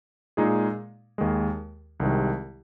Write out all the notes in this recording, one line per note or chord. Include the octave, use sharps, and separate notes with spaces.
A#2 G#3 D#4 G#4
D#2 D#3 G#3
C2 C3 D#3 G#3